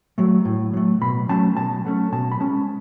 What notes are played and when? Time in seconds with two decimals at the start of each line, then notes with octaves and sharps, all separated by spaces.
0.18 F#3 A3
0.45 A2
0.73 F#3 A3
1.01 B2 B5
1.29 F#3 A3 C#4 A5
1.57 B2 A5
1.85 F#3 A3 C#4
2.12 B2 A5
2.32 B5
2.40 G#3 C#4 A5